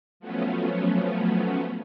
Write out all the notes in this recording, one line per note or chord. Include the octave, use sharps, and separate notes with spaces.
F3 F#3 A3 B3 C#4